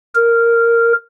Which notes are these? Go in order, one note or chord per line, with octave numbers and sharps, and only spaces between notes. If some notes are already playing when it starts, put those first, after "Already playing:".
A#4